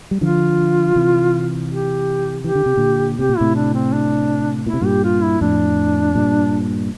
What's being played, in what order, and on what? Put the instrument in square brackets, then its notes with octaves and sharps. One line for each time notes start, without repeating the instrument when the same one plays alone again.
[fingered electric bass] G3
[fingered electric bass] D3 F3 [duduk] F4
[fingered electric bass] C3 E3
[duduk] G4
[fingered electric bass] E3 [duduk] G4
[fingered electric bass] D3
C3
A#2 D3
[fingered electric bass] C3 [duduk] G4
[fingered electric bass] A#2
[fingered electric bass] A2 C3 [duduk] E4
[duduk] D4
C4
D4
[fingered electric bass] A#2 [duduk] E4
[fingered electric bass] C3
[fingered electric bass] G2 A#2 [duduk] G4
[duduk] F4
E4
[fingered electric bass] F2 A2 [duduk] D4
[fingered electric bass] G2 A#2